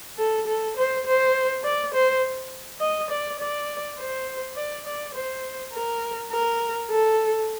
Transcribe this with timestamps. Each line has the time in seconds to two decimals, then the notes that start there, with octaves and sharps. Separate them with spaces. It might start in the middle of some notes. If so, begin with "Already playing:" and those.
0.18 A4
0.47 A4
0.77 C5
1.06 C5
1.64 D5
1.94 C5
2.81 D#5
3.11 D5
3.39 D5
3.98 C5
4.56 D5
4.86 D5
5.15 C5
5.73 A#4
6.32 A#4
6.90 A4